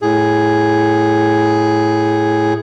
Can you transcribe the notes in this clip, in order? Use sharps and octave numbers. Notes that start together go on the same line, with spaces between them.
A2 G#4